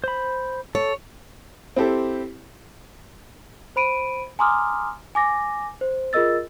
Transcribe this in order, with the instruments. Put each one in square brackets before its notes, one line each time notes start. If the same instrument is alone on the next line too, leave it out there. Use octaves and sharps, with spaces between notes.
[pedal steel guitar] C5 B5
[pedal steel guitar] A4 [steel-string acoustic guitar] C#5
[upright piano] C4 E4 G4 A4
[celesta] C5 B5 D7 D#7
G#5 A#5 C6 D6 D#6 F6
G#5 D6 A#6
C5
F4 G#4 A#4 D#5 E6 A6